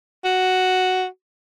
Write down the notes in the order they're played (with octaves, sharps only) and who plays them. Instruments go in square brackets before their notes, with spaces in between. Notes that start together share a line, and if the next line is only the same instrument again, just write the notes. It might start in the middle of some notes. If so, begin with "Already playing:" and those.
[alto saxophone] F#4